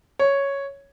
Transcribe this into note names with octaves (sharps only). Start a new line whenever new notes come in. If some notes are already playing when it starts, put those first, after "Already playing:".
C#5